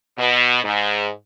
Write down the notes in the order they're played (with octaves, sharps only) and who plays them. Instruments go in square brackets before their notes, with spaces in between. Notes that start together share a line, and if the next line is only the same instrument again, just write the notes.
[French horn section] B2
G#2